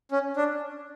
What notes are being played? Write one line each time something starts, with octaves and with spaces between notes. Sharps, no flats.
C#4
D4